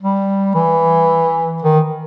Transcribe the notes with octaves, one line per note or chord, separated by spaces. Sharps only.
G3
E3
D#3